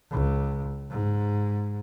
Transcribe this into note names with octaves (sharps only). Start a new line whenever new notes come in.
C#2
G#2